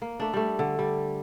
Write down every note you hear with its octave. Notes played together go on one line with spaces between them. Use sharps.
A#3
A3 D4
G3 A3
D3
G3